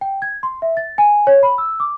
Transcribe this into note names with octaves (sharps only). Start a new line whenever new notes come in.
G5
G#6
C6
E5
A6
G#5
C#5
B5
E6
D6